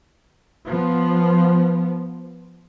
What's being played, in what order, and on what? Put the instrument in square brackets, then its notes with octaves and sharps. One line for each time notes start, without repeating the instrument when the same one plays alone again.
[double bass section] F3 B3